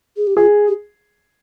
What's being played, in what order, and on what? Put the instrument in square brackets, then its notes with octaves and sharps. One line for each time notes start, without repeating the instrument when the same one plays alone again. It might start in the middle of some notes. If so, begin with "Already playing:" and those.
[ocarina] G#4
G4
[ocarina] F4 [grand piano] G#4
[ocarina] G4